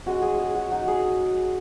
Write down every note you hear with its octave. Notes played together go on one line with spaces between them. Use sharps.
G#3 C#4 F#4
G#4
G#4
F#4
F#3 D#4 F#4
G#4